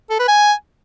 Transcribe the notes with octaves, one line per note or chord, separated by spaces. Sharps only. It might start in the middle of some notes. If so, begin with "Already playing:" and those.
A4
B4
G#5